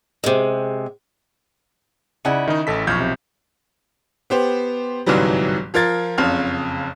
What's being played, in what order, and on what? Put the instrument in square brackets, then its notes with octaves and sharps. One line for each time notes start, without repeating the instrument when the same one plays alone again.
[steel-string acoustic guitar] C3 G#3
[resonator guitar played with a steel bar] C#3 E4 [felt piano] D#4 D5 F#5
[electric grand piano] D#3 D#4 [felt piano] D#5
[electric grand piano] A1 A4 B6
[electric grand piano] B1 F3 G6 [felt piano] C#6 F6 G#6
[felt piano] C3
[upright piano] B3 G4 C5
G1 C2 G#2 E3 F#3 G3
F3 F4 A#4 G#6 A6
F#1 F2 C#3 F5 F6